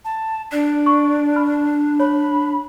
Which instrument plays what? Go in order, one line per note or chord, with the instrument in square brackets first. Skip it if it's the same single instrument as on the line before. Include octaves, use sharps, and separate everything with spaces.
[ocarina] A5
[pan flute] D4 [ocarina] D5
[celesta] C#6
B5 F6
[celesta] C#5 [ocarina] B5